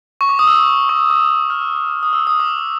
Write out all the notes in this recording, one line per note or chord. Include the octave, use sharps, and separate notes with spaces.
C#6
D6
D#6
E6
C#6
D6
F6
E6
D#6
D#6
E6
D#6
D6